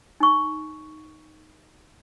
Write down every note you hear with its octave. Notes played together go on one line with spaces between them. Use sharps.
D#4 C#6